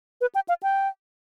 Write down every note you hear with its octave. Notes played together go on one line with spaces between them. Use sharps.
B4
G5
F5
G5